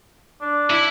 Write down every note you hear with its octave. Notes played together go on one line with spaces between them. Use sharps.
D4
E4